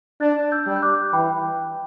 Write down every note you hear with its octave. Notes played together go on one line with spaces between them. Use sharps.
D4 F#6 A6
E6 G6
G3
G6
D6 F#6
E3 G5 B5